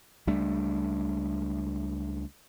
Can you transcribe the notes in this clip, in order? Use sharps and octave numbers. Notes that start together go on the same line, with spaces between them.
C#2 G3 A3 D4